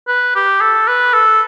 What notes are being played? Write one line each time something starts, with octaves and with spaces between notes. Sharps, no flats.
B4
G4
A4
B4
A4